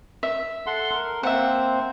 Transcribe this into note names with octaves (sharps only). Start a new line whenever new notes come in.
E5
A4 F#5 C6
A#4
A#3 C4 C5 E5 F#5